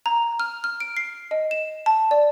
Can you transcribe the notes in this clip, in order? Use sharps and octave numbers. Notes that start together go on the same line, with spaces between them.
A#5
F6
F6
D7
C7
D#5
E7
A5
D5